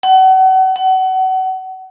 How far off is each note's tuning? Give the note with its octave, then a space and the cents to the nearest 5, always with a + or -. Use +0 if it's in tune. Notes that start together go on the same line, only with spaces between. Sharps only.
F#5 +35
F#5 +30